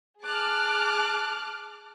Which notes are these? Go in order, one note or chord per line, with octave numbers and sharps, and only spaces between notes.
G#4 A5 D6 F6 F#6